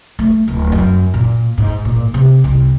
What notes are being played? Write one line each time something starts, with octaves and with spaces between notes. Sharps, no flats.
A3
D1
F#2
A#2
G#2
A#2
C3
C2